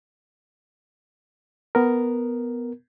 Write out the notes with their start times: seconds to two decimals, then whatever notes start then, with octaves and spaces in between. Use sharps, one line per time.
1.75 B3 A#4